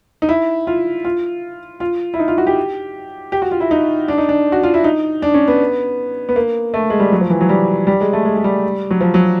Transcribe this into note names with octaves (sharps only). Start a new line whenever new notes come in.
D#4
E4
F4
F4
F4
E4
D#4
F4
F#4
G4
G4
F#4
F4
E4
D#4
D4
D#4
D4
F#4
F4
E4
D#4
D4
C#4
B3
B3
A#3
A3
G#3
G3
F#3
F3
E3
F#3
G3
G3
G#3
A3
G#3
G#3
G3
F#3
F3
F#3